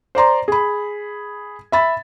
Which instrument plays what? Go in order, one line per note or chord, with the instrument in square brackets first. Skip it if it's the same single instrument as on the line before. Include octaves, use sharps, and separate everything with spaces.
[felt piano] C5 D5 A#5 C6
G#4 B5
E5 B5 A6